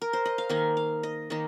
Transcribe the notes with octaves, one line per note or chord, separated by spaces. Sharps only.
A#4
C5
D#5
F5
D#3 A#3 D#4 G#5
F5
D#5
D#3 A#3 D#4